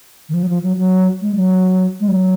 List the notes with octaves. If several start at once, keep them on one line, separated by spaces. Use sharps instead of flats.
D#3
F3
F#3
F3
F#3
F#3
G#3
F#3
G#3
F#3